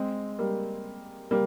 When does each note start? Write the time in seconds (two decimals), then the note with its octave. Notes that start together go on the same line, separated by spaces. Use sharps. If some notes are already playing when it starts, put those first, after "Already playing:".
Already playing: G#3 C4
0.39 G3 A#3
1.31 G3 A#3